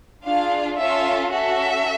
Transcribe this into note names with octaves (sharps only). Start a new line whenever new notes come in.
D4 F4 G#4 F5
C#4 F4 A4 E5
C#4 F#4 A4 E5